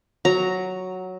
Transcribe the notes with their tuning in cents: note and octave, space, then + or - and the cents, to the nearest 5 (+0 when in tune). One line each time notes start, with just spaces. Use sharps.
F#3 +0 A#5 +0